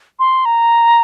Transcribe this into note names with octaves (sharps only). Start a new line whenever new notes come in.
C6
A#5